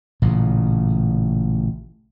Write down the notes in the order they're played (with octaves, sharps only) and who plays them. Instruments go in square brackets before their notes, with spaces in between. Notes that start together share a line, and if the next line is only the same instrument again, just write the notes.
[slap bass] A1 A#2 C#3